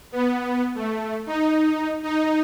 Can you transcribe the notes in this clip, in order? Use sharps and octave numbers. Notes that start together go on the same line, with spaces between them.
B3
A3
D#4
D#4